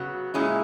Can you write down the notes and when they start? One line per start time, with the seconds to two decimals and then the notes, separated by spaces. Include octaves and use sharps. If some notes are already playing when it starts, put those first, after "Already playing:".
Already playing: C#3 F#3 B3 F#4
0.34 A#2 G#3 C#4 E4